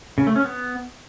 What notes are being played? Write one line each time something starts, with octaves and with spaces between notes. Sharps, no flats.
C#3
A3
C#4
B3